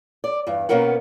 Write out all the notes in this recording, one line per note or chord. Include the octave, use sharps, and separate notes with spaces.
D5
E2 G2
B2 A#3 B3 C#4 A#4 F#5